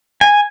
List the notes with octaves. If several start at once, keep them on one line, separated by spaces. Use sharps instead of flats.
G#5